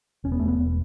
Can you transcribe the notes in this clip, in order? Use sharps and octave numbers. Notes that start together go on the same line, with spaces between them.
E1 C#4
B3
E1 A3
B3
E1